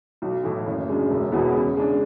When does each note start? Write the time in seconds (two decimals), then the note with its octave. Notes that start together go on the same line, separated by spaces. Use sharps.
0.22 B1
0.44 A2 E3 A3 E4
0.66 F#1
0.88 F#2 C#3 G#3 D4
1.10 E1
1.32 E2 B2 G#3 B3
1.54 C#3
1.77 G#3 D4